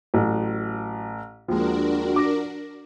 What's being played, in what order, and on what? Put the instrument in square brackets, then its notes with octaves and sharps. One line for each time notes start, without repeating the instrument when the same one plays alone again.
[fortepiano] A1 [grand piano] F#3
[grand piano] D#2 G#3 [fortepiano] F3 [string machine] D4 F#4 A#4
[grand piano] D6 A#6